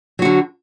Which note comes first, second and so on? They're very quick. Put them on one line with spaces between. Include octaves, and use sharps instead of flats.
F#3 F#4 D3